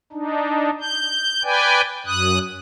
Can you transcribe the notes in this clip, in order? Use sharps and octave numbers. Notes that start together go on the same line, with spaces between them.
D4 D#4
G6
B4 D5 G5 G#5
F#2 D#6 F#6